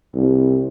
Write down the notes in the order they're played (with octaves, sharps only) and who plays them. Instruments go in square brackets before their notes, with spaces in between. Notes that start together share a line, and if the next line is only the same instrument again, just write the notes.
[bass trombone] C2